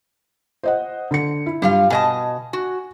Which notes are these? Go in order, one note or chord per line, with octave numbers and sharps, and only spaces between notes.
C5 D#5 F#5
D3 C#7
E4
G2 G3 F4 F5
B2 D#5 G#5 A5
F#4